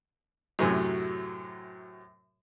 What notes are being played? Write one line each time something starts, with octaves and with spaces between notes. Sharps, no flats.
F#2 A2 C3 F#3 G#5